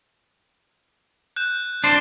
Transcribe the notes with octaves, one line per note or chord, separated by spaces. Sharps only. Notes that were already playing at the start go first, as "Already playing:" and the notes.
F#6 G6 E7
D4 C5 C#7 G7